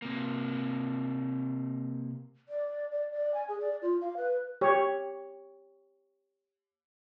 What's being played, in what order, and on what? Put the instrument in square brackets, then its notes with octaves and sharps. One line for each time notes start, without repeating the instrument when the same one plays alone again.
[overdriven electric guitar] C3 A#3
[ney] D5
D5
D5
G#5
G#4
D5
F4
F5
B4
[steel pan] G4 C#5